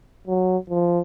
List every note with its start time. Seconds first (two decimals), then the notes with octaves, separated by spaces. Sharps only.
0.27 F#3
0.70 F3